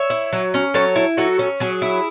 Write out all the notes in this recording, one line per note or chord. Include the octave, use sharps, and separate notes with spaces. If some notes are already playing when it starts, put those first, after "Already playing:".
Already playing: C#5 E5
E4
F#3
C#4
F#3 A4 C#5
E4
F#3 F#4 A4
C#4
F#3 G#4
E4